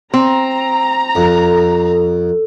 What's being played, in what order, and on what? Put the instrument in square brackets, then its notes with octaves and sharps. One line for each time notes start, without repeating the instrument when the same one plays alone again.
[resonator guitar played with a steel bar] C4 [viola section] A#5
[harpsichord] F2 [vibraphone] A4